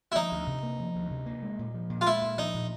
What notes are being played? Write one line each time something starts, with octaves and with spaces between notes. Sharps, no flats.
E4
F3 D#4
D2
C3
A#3
F3
D2
C3
A#3
G#3
A#2
F3
A#2
F4
G#3 E4
A#2
F3 D#4
A#2